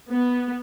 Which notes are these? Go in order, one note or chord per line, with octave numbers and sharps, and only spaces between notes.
B3